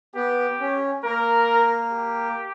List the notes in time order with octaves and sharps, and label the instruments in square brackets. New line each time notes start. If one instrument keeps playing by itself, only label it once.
[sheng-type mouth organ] B3 [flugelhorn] G4
[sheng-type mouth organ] C#4
[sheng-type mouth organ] A#3 [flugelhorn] A#4
[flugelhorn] G4